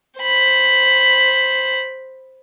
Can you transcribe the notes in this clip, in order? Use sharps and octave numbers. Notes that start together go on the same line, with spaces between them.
C5 B5